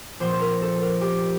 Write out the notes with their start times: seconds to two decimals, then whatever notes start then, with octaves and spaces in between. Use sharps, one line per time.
0.20 A#1 A#2 F3 C4 C5
0.33 C5
0.41 A#4
0.62 A4
0.81 A#4
1.01 G4